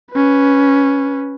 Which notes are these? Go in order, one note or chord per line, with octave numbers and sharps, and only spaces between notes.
C#4 B4